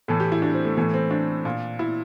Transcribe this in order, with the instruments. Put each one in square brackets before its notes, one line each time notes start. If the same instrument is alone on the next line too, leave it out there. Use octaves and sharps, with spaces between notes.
[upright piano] A2 E3 A4
G4
E4
D4
C4
A3
A2 E3 A3
C4
D4
A#2
E4